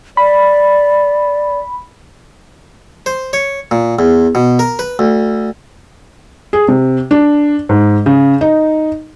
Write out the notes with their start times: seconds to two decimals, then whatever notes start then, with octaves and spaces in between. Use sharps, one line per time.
0.17 D5 B5
3.06 C5
3.33 C#5
3.71 A#2
3.99 E2
4.35 B2
4.59 A#4
4.79 B4
4.99 D2
6.53 G#4
6.68 C3
7.11 D4
7.69 G#2
8.06 C#3
8.41 D#4